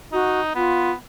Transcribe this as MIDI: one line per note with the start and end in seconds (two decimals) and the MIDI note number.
0.12 0.55 63
0.12 0.39 66
0.55 0.94 59
0.55 0.91 65